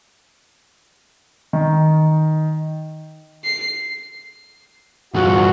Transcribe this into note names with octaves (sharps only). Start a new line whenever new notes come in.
D#3
C7
E2 G2 F3 F4 F#4